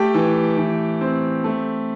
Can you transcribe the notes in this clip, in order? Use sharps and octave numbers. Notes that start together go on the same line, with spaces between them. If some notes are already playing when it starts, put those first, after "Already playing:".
Already playing: A3 G4 G5
E3
E3
C4
A3